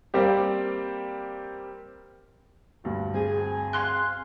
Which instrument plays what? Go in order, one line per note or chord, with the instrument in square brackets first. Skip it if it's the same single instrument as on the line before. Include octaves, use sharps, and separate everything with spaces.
[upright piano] G3 A#3 C4 G4
[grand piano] D2 G2 F#4
[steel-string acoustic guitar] C4 G#4 [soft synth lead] G#5
[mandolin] F5 C6 F#6